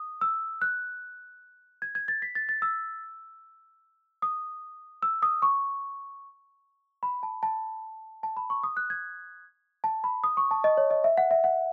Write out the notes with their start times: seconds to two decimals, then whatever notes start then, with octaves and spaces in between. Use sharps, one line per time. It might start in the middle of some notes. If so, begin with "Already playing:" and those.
Already playing: D#6
0.21 E6
0.62 F#6
1.82 G#6
1.95 G#6
2.08 A6
2.22 B6
2.35 A6
2.49 A6
2.62 E6
4.22 D#6
5.02 E6
5.22 D#6
5.42 C#6
7.03 B5
7.23 A5
7.43 A5
8.23 A5
8.37 B5
8.50 C#6
8.63 D#6
8.77 F#6
8.90 G#6
9.84 A5
10.04 B5
10.24 D#6
10.37 C#6
10.51 A5
10.64 D#5
10.77 C#5
10.90 D#5
11.04 E5
11.17 F#5
11.31 E5
11.44 F#5